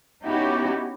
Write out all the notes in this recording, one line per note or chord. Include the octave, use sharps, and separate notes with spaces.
B3 C#4 D#4 E4 F#4 G4